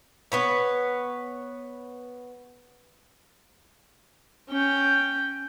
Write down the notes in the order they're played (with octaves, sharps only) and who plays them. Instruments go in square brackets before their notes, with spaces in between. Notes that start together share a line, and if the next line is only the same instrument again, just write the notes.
[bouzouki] B3 B4 C#5
[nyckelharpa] C#4 G5